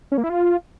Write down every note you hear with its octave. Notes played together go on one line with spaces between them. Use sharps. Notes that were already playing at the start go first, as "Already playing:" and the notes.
C#4
A#3
E4
F4